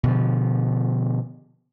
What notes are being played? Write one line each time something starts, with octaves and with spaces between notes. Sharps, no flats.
B2 D3 F3